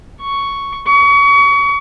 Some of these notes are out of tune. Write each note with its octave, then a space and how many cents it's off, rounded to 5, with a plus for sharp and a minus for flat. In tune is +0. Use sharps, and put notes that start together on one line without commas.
C#6 +5
C#6 +35